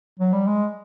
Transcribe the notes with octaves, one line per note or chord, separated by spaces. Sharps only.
F#3
G3
G#3